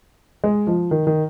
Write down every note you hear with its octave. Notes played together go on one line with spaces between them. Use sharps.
G#3
F3
D#3
D#3